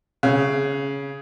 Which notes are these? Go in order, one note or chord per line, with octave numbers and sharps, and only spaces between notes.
C#3